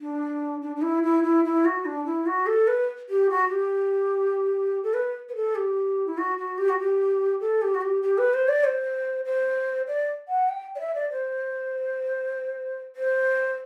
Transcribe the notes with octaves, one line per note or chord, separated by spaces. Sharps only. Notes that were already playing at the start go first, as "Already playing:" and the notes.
D4
D4
D4
E4
E4
E4
E4
F#4
D4
E4
F#4
A4
B4
G4
F#4
G4
A4
B4
B4
A4
G4
E4
F#4
F#4
G4
F#4
G4
A4
G4
F#4
G4
G4
B4
C5
D5
C5
C5
D5
F#5
G5
D5
E5
D5
C5
C5